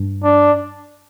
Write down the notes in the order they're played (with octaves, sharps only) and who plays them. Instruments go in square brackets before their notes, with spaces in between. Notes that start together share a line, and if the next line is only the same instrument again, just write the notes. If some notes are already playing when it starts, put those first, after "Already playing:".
Already playing: [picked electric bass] G2
[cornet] D4